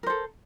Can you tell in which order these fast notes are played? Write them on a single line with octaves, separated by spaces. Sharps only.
A#4 C5 A4